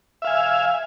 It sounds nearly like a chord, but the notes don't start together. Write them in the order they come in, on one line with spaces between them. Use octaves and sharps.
E5 F5 G#5